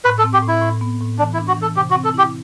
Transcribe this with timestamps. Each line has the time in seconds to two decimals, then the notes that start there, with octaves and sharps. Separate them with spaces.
0.05 A2 B4
0.19 A4
0.24 C4
0.33 G4
0.42 A2
0.48 E4
0.62 A2
0.81 B3
1.00 A2
1.19 E3 D4
1.33 E4
1.38 D4
1.48 F#4
1.57 E3 A4
1.76 C3 G4
1.91 F#4
1.95 C4
2.04 A4
2.14 E4 G4